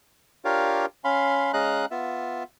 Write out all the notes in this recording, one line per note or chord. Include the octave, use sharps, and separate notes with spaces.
D4 F4 G4 A#4 C#5 F5
C#4 F5 B5 C6
G#3 C#4 D#5 F5 A#5 F#6
B3 F4 E5